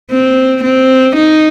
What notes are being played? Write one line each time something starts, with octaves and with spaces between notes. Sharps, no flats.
C4
C4
D#4